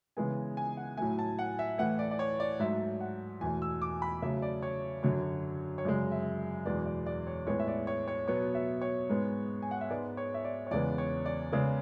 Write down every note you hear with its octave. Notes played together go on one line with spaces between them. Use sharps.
C#3 E3 G#3 B3 G#5
G#5
F#5
A2 F#3 A3 G#5
A5
F#5
E5
A2 E3 A3 F#5
D5
D5
C#5
D5
G#2 F#3 A3 E5
F#5
E2 B2 A3 G#5
E6
D6
B5
C#3 F#3 A3 E5
D5
C#5
F#2 D3 F#3 C#5
C#5
F#2 C#3 G#3 D5
E5
E2 B2 G#3 B3 D5
D5
D5
C#5
A2 G#3 B3 C#5
E5
D5
C#5
C#5
B2 F#3 B3 C#5
E5
C#5
G#2 G#3 B3
G#5
F#5
E5
G#2 G#3 B3 D5
C#5
E5
D5
C#5
E2 C#3 G#3 B3 D5
C#5
D5
C#3 G#3 B3 D5